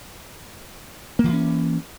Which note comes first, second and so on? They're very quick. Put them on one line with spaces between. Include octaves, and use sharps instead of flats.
A#3 D#3 E3 C#4